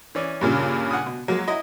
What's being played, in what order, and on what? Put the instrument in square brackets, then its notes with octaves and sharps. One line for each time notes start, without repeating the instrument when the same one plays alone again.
[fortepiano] E3 C#4 D5
[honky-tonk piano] G2 A#2 C#3
[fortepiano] F#5 G#5 D#6
B2
[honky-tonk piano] F#3 [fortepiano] G#3 A#3
[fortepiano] E4 D#5